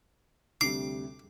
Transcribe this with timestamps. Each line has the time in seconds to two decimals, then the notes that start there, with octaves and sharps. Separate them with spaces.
0.61 D2 C3 G3 D6 C7